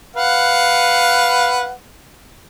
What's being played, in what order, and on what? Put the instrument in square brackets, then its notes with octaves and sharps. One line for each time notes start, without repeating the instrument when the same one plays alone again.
[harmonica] B4 F5 F#5